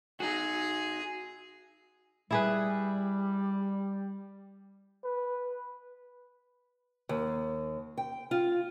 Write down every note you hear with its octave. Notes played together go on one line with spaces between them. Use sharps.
D#4 F#4 G#4
G3 E4 G#4 B4
B4
D#2
G5
F4